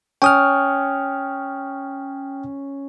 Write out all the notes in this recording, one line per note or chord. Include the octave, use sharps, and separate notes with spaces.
C#4 G5 D#6 F6